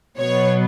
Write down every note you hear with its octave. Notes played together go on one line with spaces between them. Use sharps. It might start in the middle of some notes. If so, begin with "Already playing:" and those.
B2 F#3 B3 C#5